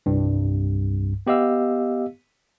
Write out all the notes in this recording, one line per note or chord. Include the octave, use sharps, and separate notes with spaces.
C2 G2
B3 G4 D#5 F5 E6